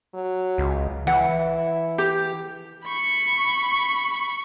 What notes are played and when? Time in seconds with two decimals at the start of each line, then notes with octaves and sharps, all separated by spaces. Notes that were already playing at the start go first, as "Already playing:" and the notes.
0.15 F#3
0.58 C#2
1.07 E3 E4 F#5
1.98 G4
2.85 B5 C#6